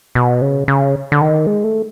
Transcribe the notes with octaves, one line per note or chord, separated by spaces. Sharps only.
B2
C#3
C#3
D3
D#3
G#3
A3